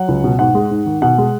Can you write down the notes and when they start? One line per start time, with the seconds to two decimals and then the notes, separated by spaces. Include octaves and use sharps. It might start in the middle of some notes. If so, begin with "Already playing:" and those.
Already playing: F#3 F#5
0.08 C#2
0.24 B2
0.39 G#2 F#5
0.55 G#3
0.71 G#2
0.86 D#3
1.02 B2 F#5
1.18 G#3